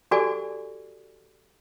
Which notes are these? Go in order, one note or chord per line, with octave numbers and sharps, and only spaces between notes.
F#4 G4 A4 D5 G#5 D6